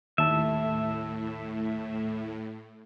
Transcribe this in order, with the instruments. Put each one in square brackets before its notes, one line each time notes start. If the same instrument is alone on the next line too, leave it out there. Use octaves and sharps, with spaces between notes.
[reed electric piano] D#2 A5 [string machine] A2 [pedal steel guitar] E5